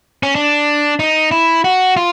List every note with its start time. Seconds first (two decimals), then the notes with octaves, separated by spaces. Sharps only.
0.23 C#4
0.35 D4
0.99 D#4
1.31 E4
1.64 F#4
1.97 F4